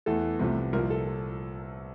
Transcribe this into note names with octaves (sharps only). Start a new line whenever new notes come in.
E2 E3 A3 A4
C2 C3 F3 A3
C2 A#2 F3 A#4
A4